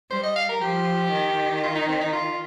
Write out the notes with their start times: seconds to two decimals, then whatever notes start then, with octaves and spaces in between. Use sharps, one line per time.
0.11 G3 C5
0.23 D#5
0.36 F5
0.49 A#4
0.61 F3 G4
1.11 D#3
1.63 F4
1.75 D#4
1.88 C4
2.01 D#4
2.13 F4